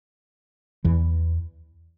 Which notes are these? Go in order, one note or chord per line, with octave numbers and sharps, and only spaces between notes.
E2 E3